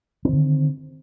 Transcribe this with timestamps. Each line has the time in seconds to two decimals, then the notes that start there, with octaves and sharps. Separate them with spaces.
0.25 C4
0.29 D#3
0.33 D3